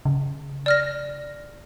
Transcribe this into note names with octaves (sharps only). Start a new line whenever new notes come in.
C#3
D5 F6 A#6